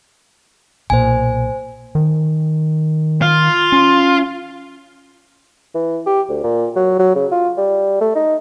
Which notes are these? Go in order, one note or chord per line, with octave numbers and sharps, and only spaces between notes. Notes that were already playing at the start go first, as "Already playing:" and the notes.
B1 A#2 C5 G#5
D#3
F4
C#4
E3
G4
D2
A#2
F#3
F#3
C#3
F4
G3
A3
D#4